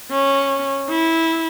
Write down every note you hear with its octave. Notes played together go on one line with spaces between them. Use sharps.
C#4
E4